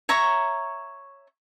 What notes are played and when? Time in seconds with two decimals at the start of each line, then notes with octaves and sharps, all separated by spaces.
0.09 C#5 E5 A#5 C#6